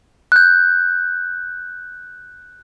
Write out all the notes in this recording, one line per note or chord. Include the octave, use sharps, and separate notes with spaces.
F#6 G6